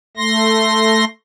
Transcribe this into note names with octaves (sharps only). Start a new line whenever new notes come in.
A3 C6 A#6